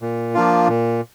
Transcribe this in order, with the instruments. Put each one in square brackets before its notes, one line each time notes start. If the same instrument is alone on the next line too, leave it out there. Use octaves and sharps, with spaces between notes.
[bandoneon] A#2
F3 A#3 D4 F4
A#2